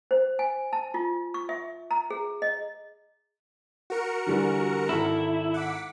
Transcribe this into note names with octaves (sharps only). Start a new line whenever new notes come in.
C5
G#5
A5
F4
C#6
E5
A#5
G#4
D#5
F#4 A#4 C#7
D3 E3 G3
G#1 E4 A4 A#5
F#5 D6 B6